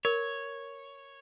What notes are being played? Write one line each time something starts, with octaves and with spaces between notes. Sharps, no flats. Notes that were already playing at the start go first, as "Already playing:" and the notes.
A#4 C#5